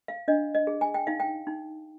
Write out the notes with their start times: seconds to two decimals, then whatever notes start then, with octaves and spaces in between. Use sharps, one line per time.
0.08 F5
0.28 D4 D#5
0.55 D#5
0.67 G#4
0.81 G#5
0.94 G5
1.07 D#4 F5
1.20 G5
1.47 D#4